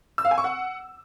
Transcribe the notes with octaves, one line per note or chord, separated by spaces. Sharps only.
E6
F5
G#5
C#6
F#5